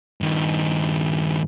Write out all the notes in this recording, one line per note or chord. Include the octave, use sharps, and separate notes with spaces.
G2 D#3